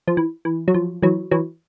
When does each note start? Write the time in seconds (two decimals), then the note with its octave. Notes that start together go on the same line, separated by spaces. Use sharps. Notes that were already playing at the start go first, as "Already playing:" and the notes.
0.08 F3
0.17 E3
0.45 E3
0.68 F#3
0.74 F3
1.02 E3 F#3
1.31 E3 F#3